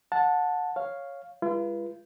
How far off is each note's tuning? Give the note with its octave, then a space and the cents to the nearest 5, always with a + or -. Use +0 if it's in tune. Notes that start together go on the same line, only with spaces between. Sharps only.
F#5 -25 A5 +0
C#5 +0 F5 +0
G#3 -35 F4 -40 B4 -20